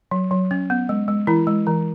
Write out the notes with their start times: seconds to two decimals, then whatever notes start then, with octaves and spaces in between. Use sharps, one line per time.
0.11 F#3
0.31 F#3
0.51 C#4
0.70 B3
0.89 G#3
1.08 G#3
1.27 E3 E4
1.47 G#3
1.67 E3